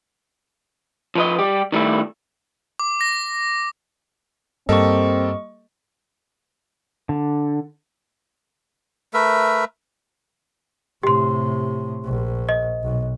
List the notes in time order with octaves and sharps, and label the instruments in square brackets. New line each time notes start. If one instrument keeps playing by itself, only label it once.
[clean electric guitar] F3 B4 D#5
G3 G4
D#3 G3 A3 E4
[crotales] D6
A#6
[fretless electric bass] G2 [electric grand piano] G3 A#3 A4 [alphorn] C4 [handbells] D#5 C#6
[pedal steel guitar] D3
[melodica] A3 A#4 B4 E5
[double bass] A2 C3 [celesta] G4 C6
[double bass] A#1
[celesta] D#5
[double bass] B1